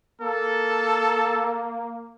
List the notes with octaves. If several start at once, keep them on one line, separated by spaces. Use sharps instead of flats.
A#3 A4